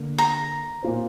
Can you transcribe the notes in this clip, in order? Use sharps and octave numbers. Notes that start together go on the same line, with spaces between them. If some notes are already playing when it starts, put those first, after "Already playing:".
Already playing: D3 A#3
A#5
A#2 A#3 F4 C5